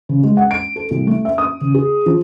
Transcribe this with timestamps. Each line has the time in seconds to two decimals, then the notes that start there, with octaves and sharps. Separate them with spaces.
0.09 C#3
0.24 G#3
0.37 F#5
0.51 D7
0.76 A4
0.91 C2
1.07 A3
1.25 E5
1.38 D#6
1.61 C#3
1.74 G#4
2.06 F3